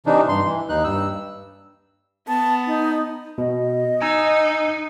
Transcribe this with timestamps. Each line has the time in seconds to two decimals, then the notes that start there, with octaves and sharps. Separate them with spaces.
0.06 C3 E3 D4 D#4
0.28 G2 C6
0.45 E3
0.69 D#2 D#4 F#6
0.84 G2 E6
2.28 B3 A5
2.67 D#4
3.38 B2 D#5
4.02 D#4 G#5 A#5 E6